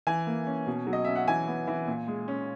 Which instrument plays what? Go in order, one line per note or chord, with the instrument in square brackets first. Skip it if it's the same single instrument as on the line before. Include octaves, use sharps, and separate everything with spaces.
[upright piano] E3 G#5
A#3
C#4
B2
F#3
D#5
C#4 E5
F#5
E3 G#5
B3
E3
A#2
G#3
C#4